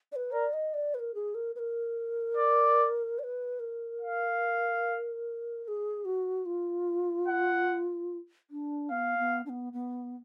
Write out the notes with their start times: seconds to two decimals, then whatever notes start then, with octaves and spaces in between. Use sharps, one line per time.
0.12 D5
0.16 B4
0.32 A#4 D5
0.53 D#5
0.74 D5
0.94 B4
0.99 A#4
1.15 G#4
1.35 A#4
1.55 B4
1.59 A#4
2.37 D5
3.19 D5
3.24 B4
3.60 A#4
4.01 F5
5.64 A#4
5.68 G#4
6.05 F#4
6.46 F4
7.28 F#5
8.50 D4
8.91 B3 F5
9.18 B3
9.46 D4
9.49 B3
9.73 B3